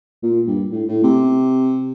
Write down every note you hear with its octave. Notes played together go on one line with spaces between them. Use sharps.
A#2
G2
A2
A2
C3